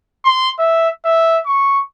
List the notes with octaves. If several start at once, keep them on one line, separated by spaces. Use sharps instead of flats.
C6
E5
E5
C#6